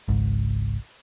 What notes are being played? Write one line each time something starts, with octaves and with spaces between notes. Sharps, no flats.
G#1 C#2 G#2